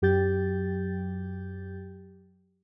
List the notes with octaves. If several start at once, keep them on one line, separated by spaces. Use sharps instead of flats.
F#2 F#3 G4 G5 G6 A6